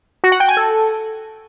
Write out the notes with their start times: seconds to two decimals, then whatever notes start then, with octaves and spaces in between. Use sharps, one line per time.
0.24 F#4
0.32 F#5
0.40 G5
0.48 G#5
0.57 A4